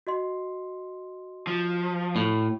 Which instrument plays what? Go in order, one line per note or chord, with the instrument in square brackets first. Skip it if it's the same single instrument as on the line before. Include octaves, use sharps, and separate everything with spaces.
[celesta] F#4 D#5 C6
[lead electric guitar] F3
[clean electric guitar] A2